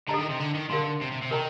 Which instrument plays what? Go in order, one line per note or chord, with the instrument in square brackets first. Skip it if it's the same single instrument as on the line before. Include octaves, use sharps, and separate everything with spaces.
[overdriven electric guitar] D3 [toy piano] A4 D#5 A#5
[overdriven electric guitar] D#3
C3
D3
D#3
[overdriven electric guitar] D3 [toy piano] A#4 F5 C6
[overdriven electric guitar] C3
C3
C3
[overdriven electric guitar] D#3 [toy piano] A#4 D#5 G5 A#5